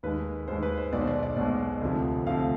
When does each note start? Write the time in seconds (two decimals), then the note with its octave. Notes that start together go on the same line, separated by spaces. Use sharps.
0.03 D#2 D#3 G#3 B4
0.48 D#2 D#3 G#3 C5
0.63 B4
0.78 C5
0.93 B1 B2 G#3 D5
1.01 C5
1.07 D5
1.23 D5
1.37 B1 B2 G#3 D5
1.81 D2 C3 F3
2.27 D2 C3 F3 F5